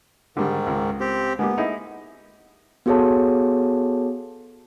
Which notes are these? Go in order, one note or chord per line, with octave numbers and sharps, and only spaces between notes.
G#2 D3 D#3 G3
C#2
C4 G4
G#3 A#3 B3 G4
D#4 E4 G#4
B3 F#4 G#4 A4 C#5 A5